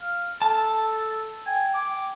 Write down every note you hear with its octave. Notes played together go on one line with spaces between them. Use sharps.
F5
A4 A5
G5 G#5
D6